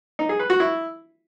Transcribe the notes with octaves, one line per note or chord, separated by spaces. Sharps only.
D#4
G#4
B4
F#4
E4